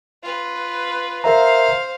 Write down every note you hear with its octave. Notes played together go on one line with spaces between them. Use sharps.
F4 B4
A#4 C5 E5 F5 A#5